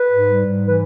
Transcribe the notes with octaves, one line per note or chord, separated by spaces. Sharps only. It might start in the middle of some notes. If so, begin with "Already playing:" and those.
Already playing: B4
G#2
G3
G#2
E3
B4